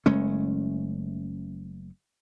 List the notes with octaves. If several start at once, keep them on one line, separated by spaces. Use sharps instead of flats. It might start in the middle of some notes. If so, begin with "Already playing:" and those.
F#1 G#3 A3 C#4